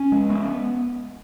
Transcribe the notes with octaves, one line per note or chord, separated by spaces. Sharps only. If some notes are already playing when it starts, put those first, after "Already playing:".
Already playing: C#4
G#3
B3